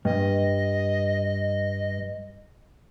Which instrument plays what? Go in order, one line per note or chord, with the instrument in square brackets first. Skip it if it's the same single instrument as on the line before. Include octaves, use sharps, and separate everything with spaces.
[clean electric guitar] G2 [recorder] D#5